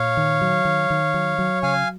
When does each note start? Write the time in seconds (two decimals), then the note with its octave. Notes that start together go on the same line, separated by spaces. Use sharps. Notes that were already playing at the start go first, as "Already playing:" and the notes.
Already playing: A#2 C#5 F5
0.17 D#3
0.41 F#3
0.65 D#3
0.90 D#3
1.14 F#3
1.39 F#3
1.63 C#3 F5 G#5